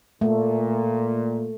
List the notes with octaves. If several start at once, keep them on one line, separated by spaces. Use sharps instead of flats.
A#2 A3